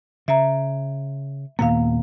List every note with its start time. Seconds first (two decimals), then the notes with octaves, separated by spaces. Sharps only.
0.28 C#3 E5 A#5
1.59 D#2 A#2 A#3 B3 F5